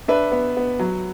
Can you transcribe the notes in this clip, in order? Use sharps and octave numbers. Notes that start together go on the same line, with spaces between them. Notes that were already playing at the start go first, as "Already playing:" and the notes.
D4 B4 E5
B3
B3
F#3